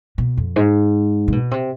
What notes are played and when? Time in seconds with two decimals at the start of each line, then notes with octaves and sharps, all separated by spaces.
0.18 B2
0.37 F2
0.56 G#2
1.28 C3
1.32 B2
1.51 C3